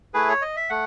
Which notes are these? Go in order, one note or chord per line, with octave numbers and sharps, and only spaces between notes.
A3 E4 G#4 B4
C#5
D#5
E5
A3 F#5